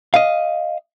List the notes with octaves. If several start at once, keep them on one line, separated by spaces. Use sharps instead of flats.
D#5 F5